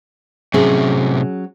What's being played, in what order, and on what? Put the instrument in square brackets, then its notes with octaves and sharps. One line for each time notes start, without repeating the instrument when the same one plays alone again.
[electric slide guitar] A2 C3 [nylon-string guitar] F#3 C#4 G#4